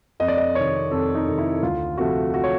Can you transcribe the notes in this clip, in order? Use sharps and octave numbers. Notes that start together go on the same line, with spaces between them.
F2 D#5
D5
D#5
C3 D#3 C#5
F2 A4
D#4
C3 D#3
E4
D2 F4
C3 F3 A3 F#4
F#4
C#5